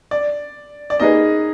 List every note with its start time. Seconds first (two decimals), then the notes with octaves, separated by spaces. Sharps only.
0.11 D5
0.90 D5
1.00 A#3 D#4 G#4 B4 D#5